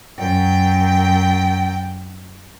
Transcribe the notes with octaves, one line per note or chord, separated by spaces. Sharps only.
F#2 G5